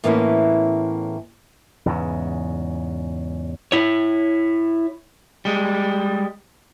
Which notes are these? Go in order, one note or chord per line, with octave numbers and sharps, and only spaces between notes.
A2 E3 A#3 B3 C#4 E4
E2 G#2 C#3
E4 C#5
G3 G#3